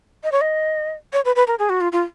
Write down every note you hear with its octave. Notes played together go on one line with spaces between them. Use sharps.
D#5
C#5
D#5
C#5
B4
B4
A#4
G#4
F#4
F4
F4